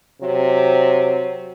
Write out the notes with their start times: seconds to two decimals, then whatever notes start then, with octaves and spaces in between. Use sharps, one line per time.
0.22 C3 F#3